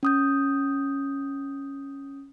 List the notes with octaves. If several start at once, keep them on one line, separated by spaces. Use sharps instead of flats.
C#4 D#6 G6